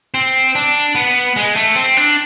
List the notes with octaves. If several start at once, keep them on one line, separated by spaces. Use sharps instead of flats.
C4
D4
B3
G#3
A3
C4
D4